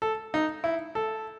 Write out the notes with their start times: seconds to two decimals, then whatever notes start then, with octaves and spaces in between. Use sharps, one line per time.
0.02 A4
0.34 D#4
0.64 E4
0.95 A4